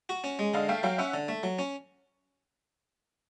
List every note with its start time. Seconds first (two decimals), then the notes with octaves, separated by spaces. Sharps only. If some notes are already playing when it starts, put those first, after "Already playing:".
0.09 F#4
0.24 C#4
0.39 G#3
0.54 D3 D#5 F5
0.69 A3 F5 G5
0.83 F#3 F5 G5
0.98 C#4 E5 F#5
1.14 D3
1.28 A3
1.43 F#3
1.59 C#4